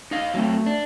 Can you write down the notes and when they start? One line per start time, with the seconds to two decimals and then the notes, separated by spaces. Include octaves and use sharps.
0.11 D#4 D#5 F5
0.34 F#3 A3 C4
0.66 D4